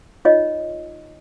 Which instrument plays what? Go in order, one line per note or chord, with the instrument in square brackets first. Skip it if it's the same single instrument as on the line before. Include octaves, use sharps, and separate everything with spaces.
[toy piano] D#4 F4 C#5 D#5